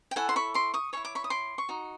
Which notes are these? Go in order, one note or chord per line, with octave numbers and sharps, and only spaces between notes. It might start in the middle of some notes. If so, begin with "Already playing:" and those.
G5
E4 A4 C#5 F#5 G#5
C6
B5 C#6
C6 D6
C#6 D#6
E4 A4 C#5 C#6
D6
B5 C#6
D#6
C6 D6
C#6
D#4 F#4